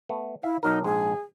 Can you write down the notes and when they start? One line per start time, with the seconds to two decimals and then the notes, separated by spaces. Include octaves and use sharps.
0.09 A3 B3
0.43 E4 E5 F5
0.63 B1 F#3 D#4 A#4
0.84 A#1 G#2 G#3 G#4